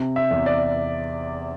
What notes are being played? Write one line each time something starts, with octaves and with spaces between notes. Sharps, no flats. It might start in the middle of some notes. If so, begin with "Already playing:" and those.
Already playing: C3
E5
E2
D5